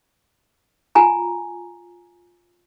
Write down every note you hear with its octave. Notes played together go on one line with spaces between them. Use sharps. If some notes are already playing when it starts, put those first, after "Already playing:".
F4 G#5 A#5